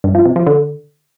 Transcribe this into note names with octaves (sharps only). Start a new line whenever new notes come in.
G2
F3
C3
F3
D3